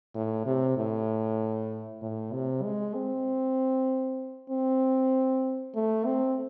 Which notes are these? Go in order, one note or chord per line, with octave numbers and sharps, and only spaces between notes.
A2
C3
A2
A2
C3
G#3
C4
C4
A3
C4